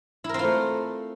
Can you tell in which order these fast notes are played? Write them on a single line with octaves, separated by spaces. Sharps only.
E4 A#4 C4 F4 A3